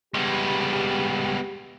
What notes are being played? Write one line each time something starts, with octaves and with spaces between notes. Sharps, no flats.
C#2 G3 G#3 B3 G4